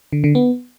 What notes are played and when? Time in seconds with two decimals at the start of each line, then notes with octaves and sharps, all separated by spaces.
0.13 D3
0.24 D3
0.35 B3